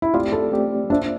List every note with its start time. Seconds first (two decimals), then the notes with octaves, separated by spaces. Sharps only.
0.02 E4
0.14 A3 C4 F4 G4 D5
0.33 A4
0.52 A3 C4 G4 D5
0.90 A#3 D4 F4 C5 E5